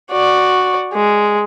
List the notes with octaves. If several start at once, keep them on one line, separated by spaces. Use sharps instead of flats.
F#4 D5
G#3